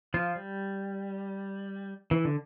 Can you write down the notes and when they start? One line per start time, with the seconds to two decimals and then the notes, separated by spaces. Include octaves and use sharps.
0.14 F3 F4
0.36 G3
2.11 E3
2.25 D3